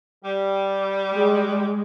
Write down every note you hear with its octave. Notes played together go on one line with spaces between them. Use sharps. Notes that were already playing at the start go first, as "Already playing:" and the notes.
G3
G#3